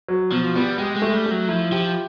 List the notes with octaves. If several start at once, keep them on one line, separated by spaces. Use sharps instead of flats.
F#3
B2 F3
G3 B3
G#3 G4
G#3
A3
G3
F#3 A3
F3 E4
F3 G4